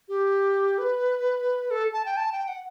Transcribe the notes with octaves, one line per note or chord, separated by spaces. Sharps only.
G4
B4
A4
A5
G5
A5
G5
F#5